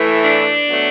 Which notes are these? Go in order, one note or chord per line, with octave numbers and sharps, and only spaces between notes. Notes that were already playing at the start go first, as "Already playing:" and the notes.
Already playing: A2 E3 A3
D4
B2 F#3 A3